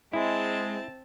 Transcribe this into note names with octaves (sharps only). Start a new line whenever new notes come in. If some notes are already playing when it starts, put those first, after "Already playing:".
G#3 C4 E4 A5